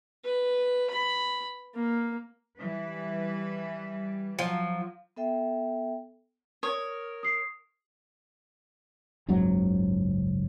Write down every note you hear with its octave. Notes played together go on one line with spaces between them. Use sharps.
B4
B5
A#3
E3 G3 B4
F3 F#3
B3 A4 E5 G5
A#4 C#5 D#6
D#6 C7
F#1 C#2 G#2 F#3